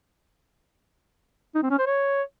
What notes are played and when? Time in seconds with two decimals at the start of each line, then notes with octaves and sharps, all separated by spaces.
1.55 D#4
1.63 C4
1.71 C#4
1.79 C5
1.86 C#5